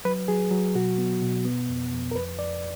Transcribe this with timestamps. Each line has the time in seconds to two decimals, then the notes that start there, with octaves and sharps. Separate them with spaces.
0.05 F#3 B4
0.28 F#3 G#4
0.51 F#3
0.75 B2 F#4
0.98 B3
1.22 B2
1.45 B3
1.69 F2
1.93 F2
2.11 A#4
2.15 F2 B4
2.39 F2 D5